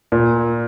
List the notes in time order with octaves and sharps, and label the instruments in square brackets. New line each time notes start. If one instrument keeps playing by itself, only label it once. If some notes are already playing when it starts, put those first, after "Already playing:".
[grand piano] A#2